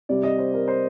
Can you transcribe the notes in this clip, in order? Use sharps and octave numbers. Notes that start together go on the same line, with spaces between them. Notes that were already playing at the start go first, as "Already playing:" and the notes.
C3 G3 D5
D#5
C5
A#4
C5